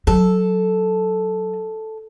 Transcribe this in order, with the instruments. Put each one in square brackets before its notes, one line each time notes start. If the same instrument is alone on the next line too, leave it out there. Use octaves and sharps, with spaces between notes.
[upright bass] F#3 [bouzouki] A4